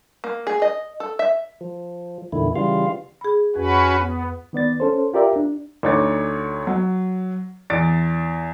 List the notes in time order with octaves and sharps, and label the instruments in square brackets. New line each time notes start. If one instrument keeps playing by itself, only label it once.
[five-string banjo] A#3
G#4
D#5
A4
E5
[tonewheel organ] F3
E2 A#2 D3 D#3 E4
C#3 E3 G3 F4 F5
[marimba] G#4 B5
[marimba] F2 [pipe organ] C#4 F#4 B4
[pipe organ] B3
[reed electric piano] D#3 B3 D5 A6
C#4 A4 C5
F4 G4 A#4 D5 E5 A#5
D4
[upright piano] D2 D#4 C#5 D6 A6
F#3
E2 A6 D7